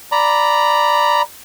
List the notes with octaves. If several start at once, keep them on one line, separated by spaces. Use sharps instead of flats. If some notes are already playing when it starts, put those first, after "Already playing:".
D5 A#5 B5